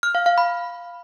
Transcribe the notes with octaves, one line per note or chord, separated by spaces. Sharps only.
F6
F5
F5
B5